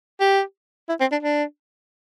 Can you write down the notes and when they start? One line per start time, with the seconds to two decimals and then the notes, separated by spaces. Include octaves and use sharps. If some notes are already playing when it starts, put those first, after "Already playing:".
0.21 G4
0.89 E4
1.00 C4
1.12 D4
1.23 D4